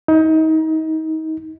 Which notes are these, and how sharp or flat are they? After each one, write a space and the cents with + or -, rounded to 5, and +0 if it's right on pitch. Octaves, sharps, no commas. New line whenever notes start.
D#4 +30